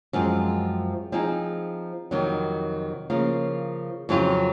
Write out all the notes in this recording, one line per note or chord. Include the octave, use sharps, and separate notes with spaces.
F#2 F3 G#3 C4
F3 C4 D#4 G#4
F2 C3 D#3 F#3
C#3 F3 A#3
F2 C#3 F#3 C4 F4